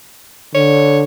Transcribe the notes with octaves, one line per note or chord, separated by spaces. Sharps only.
D3 C#5